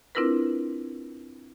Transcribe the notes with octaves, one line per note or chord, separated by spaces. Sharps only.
C4 D4 E4 F4 A#4 B4